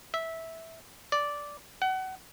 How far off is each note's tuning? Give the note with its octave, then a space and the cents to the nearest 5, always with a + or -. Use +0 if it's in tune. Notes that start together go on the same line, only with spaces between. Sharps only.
E5 -15
D5 -10
F#5 +30